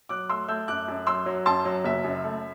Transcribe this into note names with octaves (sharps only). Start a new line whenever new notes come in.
F#3 D6 F#6
A3 C6 E6
A3 E6 G6
F#2 D6 F#6
F#2
F#3 C6 E6
F#3
F#2 A5 C6
F#3
F#1 E5
F#2
A3